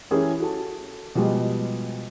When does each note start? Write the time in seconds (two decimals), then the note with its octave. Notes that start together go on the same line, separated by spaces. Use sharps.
0.11 E3 C#4 E4 G4 G#4 A#4
0.40 F#4 A4 A5
1.15 B2 F3 G3 G#3